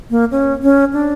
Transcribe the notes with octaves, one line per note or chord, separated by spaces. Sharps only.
A#3
C#4
C#4
D4